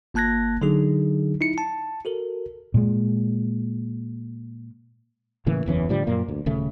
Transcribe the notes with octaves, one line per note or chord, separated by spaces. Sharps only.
G1 A#3 A5 F#6 G#6 A#6
D3 F#3 D#4 G#4
D#4 E4 C#7
A5
F#4 A4 A#4
A#2 G#3
A2 C#3 E3 A#3
F#1 E2 E3 C#4
A2 D3 F3 G3
F#2 A#2 A#3
D2
D#1 C#3 A3